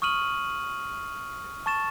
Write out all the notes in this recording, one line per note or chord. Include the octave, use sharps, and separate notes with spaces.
C#6 D#6 F6 D#7 F#7
A5 C#6 A6 E7